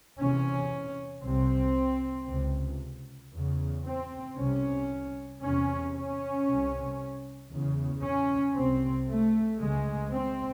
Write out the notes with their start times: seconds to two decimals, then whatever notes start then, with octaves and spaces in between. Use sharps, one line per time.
0.19 E2 C3 C#4
1.23 C2 C3 C4
2.29 C#2 C3
3.32 E2 C#3
3.86 C4
4.37 C2 C3 C#4
5.42 E2 C3 C#4
5.94 C#4
6.46 C2 C3
7.51 E2 C#3
8.03 C#4
8.55 C2 C3 C4
9.07 A3
9.60 C#2 C#3 G#3
10.12 C4